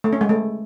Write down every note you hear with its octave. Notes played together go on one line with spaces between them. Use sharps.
A3
C#4
G#3
A3